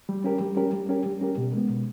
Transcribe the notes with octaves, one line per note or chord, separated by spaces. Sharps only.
G3
C#4 G4 A#4
G3
C#4 G4 A#4
G3
C#4 G4 A#4
G3
C#4 G4 A#4
B2
G#3 B3
B2